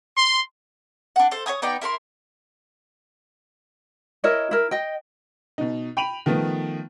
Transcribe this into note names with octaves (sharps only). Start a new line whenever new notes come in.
C6
D4 F#5
A4 C5
C#5 E5 G#5 D#6
B3 D#4 D5 G5
E4 A#4 B5 C6
E4 A#4 C#5 D#5
E4 A#4
D#5 G5
B2 D#4
G5 B5 D7 D#7 F7 F#7
D#3 F3 A3 B3